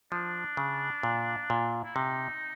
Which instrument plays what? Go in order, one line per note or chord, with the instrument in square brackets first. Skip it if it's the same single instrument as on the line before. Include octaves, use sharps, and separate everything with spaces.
[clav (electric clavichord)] F3 [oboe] D4
[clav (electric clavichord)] C#3
A#2
A#2
[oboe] E4
[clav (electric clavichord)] C3 [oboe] D#4